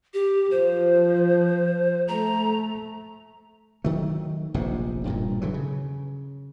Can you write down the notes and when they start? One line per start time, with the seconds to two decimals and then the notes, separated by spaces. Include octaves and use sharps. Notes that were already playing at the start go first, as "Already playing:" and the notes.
0.14 G4
0.51 F3 C5
2.08 A3 A#5
3.84 D#3 F#3 A3
4.54 F1 A#1 G#2 C3
5.05 E1 G2 A#2
5.41 D3 E3 F#3
5.54 C#3